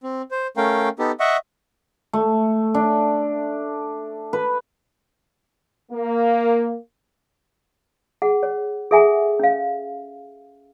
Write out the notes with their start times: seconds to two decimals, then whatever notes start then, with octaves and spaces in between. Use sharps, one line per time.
0.03 C4
0.31 C5
0.57 A3 C#4 A#4 F5 G5
0.99 B3 D#4 G4 A4
1.20 D#5 E5 F#5 C#6
2.13 A3
2.74 D4
4.33 B4
5.92 A#3
8.22 G#4 F#5
8.43 C#5
8.91 G#4 A4 E5 F#5 G#5
9.39 C#4 F5